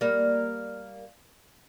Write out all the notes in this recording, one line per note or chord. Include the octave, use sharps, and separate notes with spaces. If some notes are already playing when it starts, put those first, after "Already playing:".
G3 A#3